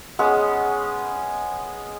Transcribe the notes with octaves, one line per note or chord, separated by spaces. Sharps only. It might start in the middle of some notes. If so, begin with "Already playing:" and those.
G#3 B3 C#4 G#4